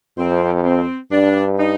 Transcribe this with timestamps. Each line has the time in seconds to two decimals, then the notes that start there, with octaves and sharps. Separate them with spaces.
0.18 F2 C4
0.64 C4
1.11 G2 D4
1.59 D#4